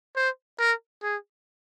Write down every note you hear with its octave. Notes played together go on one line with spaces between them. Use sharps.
C5
A#4
G#4